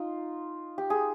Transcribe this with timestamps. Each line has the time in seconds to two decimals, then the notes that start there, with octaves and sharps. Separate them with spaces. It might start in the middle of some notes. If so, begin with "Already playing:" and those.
Already playing: D#4 F4
0.78 G4
0.90 G#4